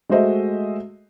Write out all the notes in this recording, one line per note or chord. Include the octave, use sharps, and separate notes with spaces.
G#3 A3 F#4 C5 D#5 E5